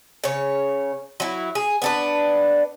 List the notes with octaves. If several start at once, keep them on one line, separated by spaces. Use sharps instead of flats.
C#3 C#5
F#3 E4
G#4
B3 D4 B4